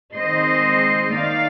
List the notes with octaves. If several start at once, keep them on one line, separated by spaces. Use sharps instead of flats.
D#3 G#3 C4 C5 D#5
D#3 A#3 D#4 D5 F5